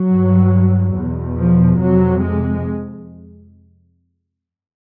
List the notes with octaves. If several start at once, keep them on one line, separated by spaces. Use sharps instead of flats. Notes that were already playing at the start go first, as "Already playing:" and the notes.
Already playing: F#3
G2
E2 B2
F3
F2 C3 F#3
G#3